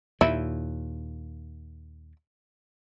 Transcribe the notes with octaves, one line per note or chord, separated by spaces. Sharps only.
D#2 A#2 E4